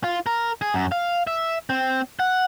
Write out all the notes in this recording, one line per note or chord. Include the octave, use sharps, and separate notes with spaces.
F4
A#4
G#4
F#2
F5
E5
C4
F#5